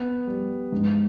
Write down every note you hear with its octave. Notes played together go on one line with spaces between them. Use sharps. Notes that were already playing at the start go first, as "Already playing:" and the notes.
Already playing: B3
G3
G#2